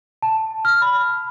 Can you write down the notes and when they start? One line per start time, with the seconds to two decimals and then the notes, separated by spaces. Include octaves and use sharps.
0.22 A5
0.65 F6
0.82 B5